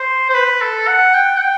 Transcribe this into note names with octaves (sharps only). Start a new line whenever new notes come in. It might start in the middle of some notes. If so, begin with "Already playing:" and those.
Already playing: C5
C5
B4
A4
F#5
G5
F#5
G5